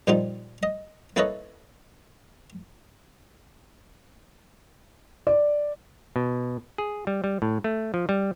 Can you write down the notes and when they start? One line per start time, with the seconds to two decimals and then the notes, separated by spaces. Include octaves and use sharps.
0.07 A#2 F3 G3 D#4 F4
0.63 D#5
1.16 A#3 E4 A4 B4 C#5 D#5
5.27 D5
6.16 B2
6.78 G#4
7.07 G3
7.24 G3
7.42 A2
7.64 A3
7.94 F3
8.09 G3